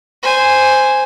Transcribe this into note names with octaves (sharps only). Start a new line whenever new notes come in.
C5 G#5